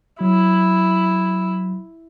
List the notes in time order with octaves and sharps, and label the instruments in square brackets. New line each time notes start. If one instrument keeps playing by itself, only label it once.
[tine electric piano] F#3 [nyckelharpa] E4